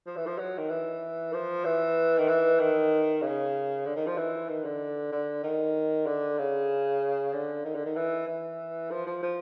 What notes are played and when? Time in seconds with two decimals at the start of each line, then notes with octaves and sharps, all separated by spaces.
0.06 F3
0.17 E3
0.26 F3
0.38 F#3
0.58 D#3
0.70 E3
1.33 F3
1.65 E3
2.18 D#3
2.28 E3
2.59 D#3
3.22 C#3
3.86 D3
3.96 D#3
4.07 F3
4.17 E3
4.49 D#3
4.64 D3
5.12 D3
5.43 D#3
6.06 D3
6.38 C#3
7.33 D3
7.65 D#3
7.75 D3
7.86 D#3
7.96 E3
8.28 E3
8.91 F3
9.06 F3
9.22 F3